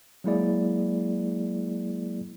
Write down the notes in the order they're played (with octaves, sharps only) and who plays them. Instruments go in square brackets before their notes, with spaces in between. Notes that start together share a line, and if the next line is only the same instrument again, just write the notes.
[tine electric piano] F#3 G#3 A#3 E4 G#4 D5